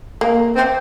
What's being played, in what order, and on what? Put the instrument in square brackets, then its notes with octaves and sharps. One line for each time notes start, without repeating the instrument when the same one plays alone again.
[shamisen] A#3
[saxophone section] C4